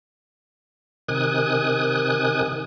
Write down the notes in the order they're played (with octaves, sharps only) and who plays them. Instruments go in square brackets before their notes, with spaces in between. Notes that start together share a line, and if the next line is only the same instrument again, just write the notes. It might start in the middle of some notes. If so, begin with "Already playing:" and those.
[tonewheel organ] C3 D#3 G#5 D#6 F#6